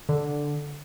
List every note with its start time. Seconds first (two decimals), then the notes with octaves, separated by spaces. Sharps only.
0.09 D3